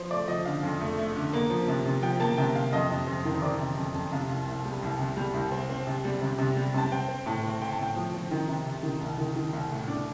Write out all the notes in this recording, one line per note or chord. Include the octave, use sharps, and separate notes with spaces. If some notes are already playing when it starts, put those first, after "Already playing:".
Already playing: F3 C5
A3 D5
F3 D#5
D3 F5
F2
A3
A3
D3
A#3
F3
C3
C3
F3 G5
A#3 A5
C3 G5
C3 F5
F2 D#5
C3
F2 C5
D#3
C5
D#3 D5
C3
F2
F2
C3 F5
C2
C2
G3
C2
C3
G3
C2
C4
C4
C3
G3
C3
C3
G3
C3 A5
C4 G5
C4
A2 A5
C4
C4 G5
A5
A2 G5
F3
F3
D#3
C3
C3
D#3
C2
D#3
D#3
C2
A2
D4